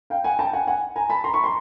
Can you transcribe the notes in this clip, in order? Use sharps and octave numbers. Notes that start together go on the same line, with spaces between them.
F5 G5
F#5 G#5
G5 A5
F#5 G#5
F#5 G#5
G#5 A#5
A5 B5
A#5 C6
B5 C#6
A#5 C6